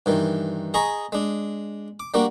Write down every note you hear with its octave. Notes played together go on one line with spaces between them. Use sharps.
G2 D#3 E3
G#4 D#5 G#5 A#5 B5 C#6
G#3 D4
D6
G3 A#3 D4 F#4